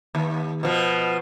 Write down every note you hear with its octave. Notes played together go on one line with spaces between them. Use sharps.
D#2
B2 F3